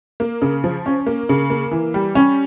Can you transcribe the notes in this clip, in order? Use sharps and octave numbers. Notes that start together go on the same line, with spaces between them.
A#3
C#3
F3
C#4
A#3
C#3
A#3
E3
G3
C#4